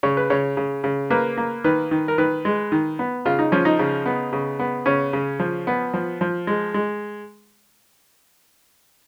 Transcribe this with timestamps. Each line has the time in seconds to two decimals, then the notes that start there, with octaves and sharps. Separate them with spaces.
0.03 C#3 C#5
0.17 B4
0.30 C#3 C#5
0.57 C#3
0.84 C#3
1.10 A#3 B4
1.37 A#3
1.64 D#3 B4
1.91 D#3
2.08 A#4
2.18 D#3 B4
2.45 G#3
2.72 D#3
2.99 B3
3.25 C#3 F4
3.39 D#4
3.52 F3 C#4
3.65 D#4
3.79 C#3
4.06 B3
4.33 C#3
4.59 B3
4.86 C#3 C#4
5.13 C#3
5.39 F3
5.67 B3
5.94 F3
6.21 F3
6.47 G#3
6.74 G#3